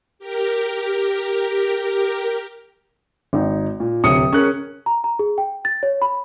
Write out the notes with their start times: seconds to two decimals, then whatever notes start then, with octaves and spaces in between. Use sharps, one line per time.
0.19 G4 A#4
3.33 G#1 D#4
3.80 A#2
4.04 D1 C3 C#5 D#6 C#7
4.33 C#4 G#4 A#4 F#6
4.86 A#5
5.04 A#5
5.19 G#4
5.38 G5
5.65 A6
5.83 C#5
6.02 B5